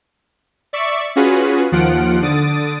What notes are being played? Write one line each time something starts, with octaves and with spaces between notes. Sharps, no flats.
D5 E5 C#6
C#4 F4 F#4 G#4 B4
D#2 F3 F4 F#5 D7
D3 D#6 A6 D7